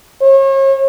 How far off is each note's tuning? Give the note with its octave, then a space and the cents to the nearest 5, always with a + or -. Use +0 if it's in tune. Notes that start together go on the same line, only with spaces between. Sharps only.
C#5 -40